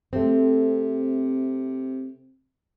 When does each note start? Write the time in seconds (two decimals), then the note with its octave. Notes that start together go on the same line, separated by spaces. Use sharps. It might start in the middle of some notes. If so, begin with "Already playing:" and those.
0.13 C3 A3 C4